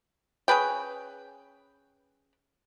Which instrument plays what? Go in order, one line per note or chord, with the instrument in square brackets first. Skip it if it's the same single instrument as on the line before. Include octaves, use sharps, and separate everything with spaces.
[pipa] C#4 G#4 B4 G5